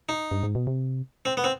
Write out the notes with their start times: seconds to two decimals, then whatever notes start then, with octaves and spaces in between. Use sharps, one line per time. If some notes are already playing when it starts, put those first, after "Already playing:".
0.09 D#4
0.31 G2
0.43 G#2
0.55 B2
0.67 C3
1.25 C4
1.37 B3
1.44 C4